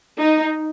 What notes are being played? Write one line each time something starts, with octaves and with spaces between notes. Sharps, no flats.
D#4